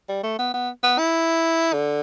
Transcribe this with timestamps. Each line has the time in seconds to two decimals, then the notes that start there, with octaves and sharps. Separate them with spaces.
0.09 G3
0.24 A3
0.38 B3
0.54 B3
0.83 B3
0.98 E4
1.73 D3